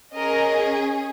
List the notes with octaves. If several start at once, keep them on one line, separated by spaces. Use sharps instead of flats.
C#4 G#4 A#4 D#5